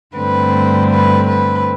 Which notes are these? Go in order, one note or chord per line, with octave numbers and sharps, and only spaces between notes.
G2 D3 A3 C4 B4
B4
B4